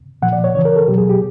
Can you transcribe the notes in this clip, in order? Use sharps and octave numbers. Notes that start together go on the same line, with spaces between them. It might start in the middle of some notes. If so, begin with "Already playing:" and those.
A#2 F3 F#5
D5
C#5
C#3 E3 C#5
A#4
A4
B2 F#3 G4
G#4
G4